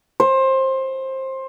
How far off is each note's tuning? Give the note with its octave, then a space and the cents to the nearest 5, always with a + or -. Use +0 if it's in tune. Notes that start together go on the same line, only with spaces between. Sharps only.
C5 +20